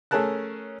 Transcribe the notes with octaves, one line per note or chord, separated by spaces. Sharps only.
A3 C#4 G#4 A#4 A5 F#6